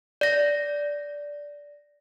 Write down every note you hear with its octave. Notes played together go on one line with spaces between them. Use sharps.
D5 A#6